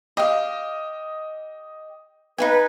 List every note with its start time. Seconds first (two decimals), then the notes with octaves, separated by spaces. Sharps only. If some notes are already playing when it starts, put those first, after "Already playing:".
0.17 G4 D#5 F5
2.38 D#4 E4 B4 G#5